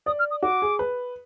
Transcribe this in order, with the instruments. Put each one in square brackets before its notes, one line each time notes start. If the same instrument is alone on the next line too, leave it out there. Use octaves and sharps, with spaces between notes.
[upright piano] D5 [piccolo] D#6
[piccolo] F6
D#6
[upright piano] F#4 [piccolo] D6
[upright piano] G#4
B4